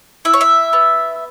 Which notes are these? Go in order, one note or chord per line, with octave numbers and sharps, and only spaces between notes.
E4 E5
C#5
E5
B3